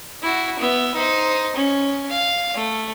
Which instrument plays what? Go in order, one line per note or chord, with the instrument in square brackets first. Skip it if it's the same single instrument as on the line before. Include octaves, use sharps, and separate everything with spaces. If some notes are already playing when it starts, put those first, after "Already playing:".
[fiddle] E4 F#4
B3 E5
D#4 C5
C#4
F5
A3